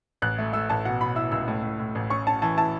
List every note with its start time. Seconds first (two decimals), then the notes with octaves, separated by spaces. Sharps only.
0.22 A1 F#6
0.38 A3
0.53 A3 E6
0.69 A1 A5
0.85 B2 F#5
1.01 B2 B5
1.16 E4 E6
1.32 C#2 E6
1.48 A2
1.63 A2
1.79 A2
1.95 A1
2.10 C#4 C#6
2.27 C#4 A5
2.42 E3 A5
2.57 E4 A5